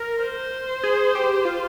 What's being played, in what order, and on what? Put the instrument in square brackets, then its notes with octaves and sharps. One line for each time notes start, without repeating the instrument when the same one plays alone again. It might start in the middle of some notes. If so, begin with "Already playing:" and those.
Already playing: [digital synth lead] A#4
[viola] C5
[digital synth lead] G#4
G4
F4